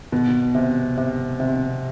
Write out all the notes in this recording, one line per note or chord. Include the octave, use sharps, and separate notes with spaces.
B2
C3
C3
C3